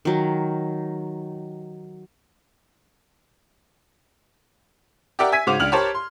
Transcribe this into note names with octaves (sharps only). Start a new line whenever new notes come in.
D#3 F#3
G4 A#4 D5 E5 F#5 G5
E5 G#5 G#6 B6 D#7
G#2 C#3 F#4 C5 D6 F7
C#2 D4 F6 F7 F#7
G4 A#4 C5 C#5 A5
C6